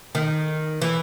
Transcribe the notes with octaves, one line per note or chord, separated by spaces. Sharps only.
D#3
E3